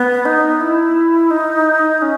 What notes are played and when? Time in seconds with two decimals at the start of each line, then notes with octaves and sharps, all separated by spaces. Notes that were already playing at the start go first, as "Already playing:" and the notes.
Already playing: B3
0.25 D#4
0.61 E4
1.31 D#4
2.02 C#4